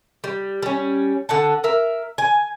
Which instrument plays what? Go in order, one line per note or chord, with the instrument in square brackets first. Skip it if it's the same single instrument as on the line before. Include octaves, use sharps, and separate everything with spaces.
[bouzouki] G3
G3 C#4
D3 F#5 A5
A#4 E5
G#5